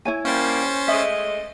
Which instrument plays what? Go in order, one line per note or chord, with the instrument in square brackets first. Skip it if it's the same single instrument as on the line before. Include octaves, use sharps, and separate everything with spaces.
[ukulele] E4 C#5 G#5
[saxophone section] G3 A#3 [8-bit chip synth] C#4 C5 A6
[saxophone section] G#3 A3 D#5 [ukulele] E5